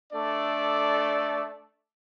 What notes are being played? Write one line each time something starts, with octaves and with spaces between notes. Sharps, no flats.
A3 D4 A4 D5